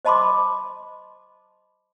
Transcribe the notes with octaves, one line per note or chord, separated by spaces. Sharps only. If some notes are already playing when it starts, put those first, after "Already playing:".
C5 D#5 A5 B5 C6 D6